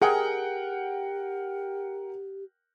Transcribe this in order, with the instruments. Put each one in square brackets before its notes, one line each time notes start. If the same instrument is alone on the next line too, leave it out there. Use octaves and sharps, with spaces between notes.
[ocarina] G4 [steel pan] G#4 [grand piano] A#4 F#5 G5